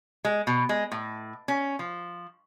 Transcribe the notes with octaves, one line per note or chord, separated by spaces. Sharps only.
G#3
B2
G#3
A2
C#4
F3